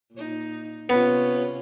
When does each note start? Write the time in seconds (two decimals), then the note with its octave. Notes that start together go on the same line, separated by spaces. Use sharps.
0.13 A#2 D#4
0.89 C3 B3 C#4 F4